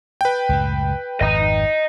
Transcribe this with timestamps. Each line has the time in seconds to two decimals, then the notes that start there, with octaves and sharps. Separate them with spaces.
0.21 B4 G5
0.49 C#2 F#2 A2
1.21 G#1 F2 D#5 A#5